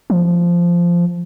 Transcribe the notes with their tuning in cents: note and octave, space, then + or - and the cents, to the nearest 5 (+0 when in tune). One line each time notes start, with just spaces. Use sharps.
F3 -10